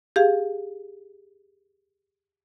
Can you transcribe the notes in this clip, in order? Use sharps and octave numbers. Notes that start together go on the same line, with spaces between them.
G4 G#4 F5